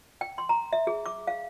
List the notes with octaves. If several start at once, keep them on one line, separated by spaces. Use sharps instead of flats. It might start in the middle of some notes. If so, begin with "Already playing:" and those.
G5
C6
A#5
E5
G#4
D6
F5